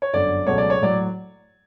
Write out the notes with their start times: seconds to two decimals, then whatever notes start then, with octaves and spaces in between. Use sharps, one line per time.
0.02 C#5
0.13 G1 F#2 D3 D5
0.47 C#2 B2 F#3 A3 C#5
0.58 D5
0.70 C#5
0.81 A2 F#3 D5